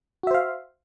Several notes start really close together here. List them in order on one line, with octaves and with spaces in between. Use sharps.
F#4 E5 C5 F5